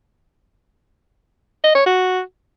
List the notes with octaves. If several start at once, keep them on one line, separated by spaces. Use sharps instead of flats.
D#5
C#5
F#4